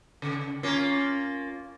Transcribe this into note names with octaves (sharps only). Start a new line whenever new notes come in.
C#3
A#3 C#4 F4